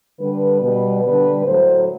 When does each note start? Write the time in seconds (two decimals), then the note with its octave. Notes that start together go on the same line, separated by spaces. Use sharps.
0.18 D3 G3 B4
0.61 B2 G3 B4
1.03 D3 G3 B4
1.45 A2 F#3 A3 C5